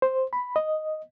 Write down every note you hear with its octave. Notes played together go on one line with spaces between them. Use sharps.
C5
B5
D#5